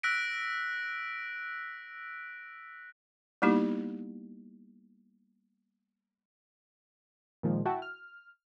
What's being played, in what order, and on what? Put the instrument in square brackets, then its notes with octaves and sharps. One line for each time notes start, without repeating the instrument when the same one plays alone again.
[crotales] E6 F#6 A#6 B6 D7
[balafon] G3 A#3 B3 D#4 E4 G4
[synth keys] A#2 D#3 F3 G#3
E4 F#4 E5 F#5 G5 A5
F6